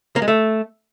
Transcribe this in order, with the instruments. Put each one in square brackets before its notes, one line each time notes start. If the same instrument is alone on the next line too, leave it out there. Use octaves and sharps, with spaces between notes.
[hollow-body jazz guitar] A#3
G#3
A3